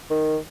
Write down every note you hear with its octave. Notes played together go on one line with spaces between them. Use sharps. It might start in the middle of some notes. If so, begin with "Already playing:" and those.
D#3